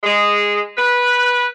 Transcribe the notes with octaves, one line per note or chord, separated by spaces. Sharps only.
G#3
B4